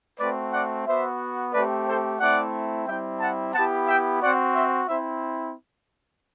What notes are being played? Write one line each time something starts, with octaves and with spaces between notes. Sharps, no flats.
A3 C4 F#4 B4 D5
D5 F#5
B3 F#4 C5 E5
A3 C4 G4 B4 D5
A4 C5
A3 C4 E4 D5 F#5
G3 C4 E4 E5 G5
F#5 A5
B3 E4 G4 F#5 A5
E5 G5
C4 F#4 D5 F#5
C5 E5
C4 E4 C5 E5